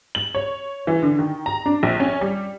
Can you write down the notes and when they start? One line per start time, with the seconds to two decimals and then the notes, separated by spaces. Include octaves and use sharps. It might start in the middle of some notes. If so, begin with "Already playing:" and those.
0.15 F#7
0.35 C#5
0.87 E3
1.03 D3
1.19 D#3
1.46 A#5
1.66 D4
1.83 A#1
2.00 C#4
2.21 G3